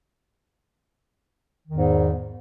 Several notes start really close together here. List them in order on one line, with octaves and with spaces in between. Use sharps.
D#3 E2 G#2